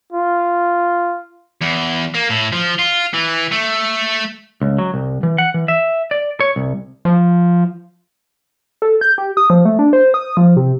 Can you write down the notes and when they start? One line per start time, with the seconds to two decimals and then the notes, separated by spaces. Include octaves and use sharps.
0.13 F4
1.61 E2
2.15 A#3
2.30 A2
2.52 F3
2.79 F4
3.14 E3
3.51 A3
4.62 C#2
4.78 F#3
4.94 C2
5.23 E3
5.38 F#5
5.54 E3
5.68 E5
6.11 D5
6.40 C#5
6.56 C2
7.05 F3
8.82 A4
9.01 G6
9.18 G4
9.37 D#6
9.50 F3
9.65 A3
9.79 D4
9.93 C5
10.14 D#6
10.37 F3
10.57 C3